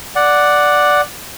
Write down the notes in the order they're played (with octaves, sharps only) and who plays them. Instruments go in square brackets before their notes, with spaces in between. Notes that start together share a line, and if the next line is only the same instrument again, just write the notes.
[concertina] D5 F#5